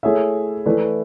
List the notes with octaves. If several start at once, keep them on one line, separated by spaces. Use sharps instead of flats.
A3 E4 G#4 C#5 E5
E3 A3 E4 B4 D5